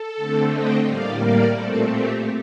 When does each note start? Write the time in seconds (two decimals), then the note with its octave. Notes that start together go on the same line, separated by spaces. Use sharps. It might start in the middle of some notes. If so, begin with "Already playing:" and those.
Already playing: A4
0.16 D3 A3 C4
0.50 D#5 G5
0.84 A2 G3 A#3 D5 F5
1.18 A#4 D5
1.51 A#2 A3 C4 A4
1.86 G4